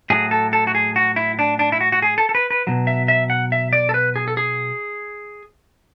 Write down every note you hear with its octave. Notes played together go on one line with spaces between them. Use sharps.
A2 F#3 G#4
A4
A4
F#4
G#4
F#4
E4
D4
D4
E4
F#4
F#4
G#4
A4
A4
B4
B4
B2 F#3
E5
E5
F#5
E5
D5
A4
B4
G#4
A4
G#4